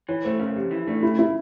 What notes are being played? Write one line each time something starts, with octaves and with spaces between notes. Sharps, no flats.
E3 C#5
A3 C5
C#3 A#4
F2 G4
E3
A3 D4
C#3 E4
E4